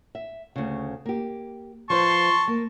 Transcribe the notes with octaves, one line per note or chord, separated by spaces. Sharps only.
E5
D2 C#3
A#3 G4
F3 B4 C5 A5 C6 C#6
A#3